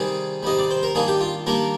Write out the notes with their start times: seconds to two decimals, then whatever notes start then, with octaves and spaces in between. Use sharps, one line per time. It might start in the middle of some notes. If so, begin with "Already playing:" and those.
Already playing: C3 D#3 G3 G#4
0.43 C3 D#3 G3 D#5
0.58 D5
0.71 C5
0.83 A#4
0.95 D#3 G3 A#3 D4 G#4
1.08 G4
1.21 F4
1.46 D#3 G3 A#3 D4 A#4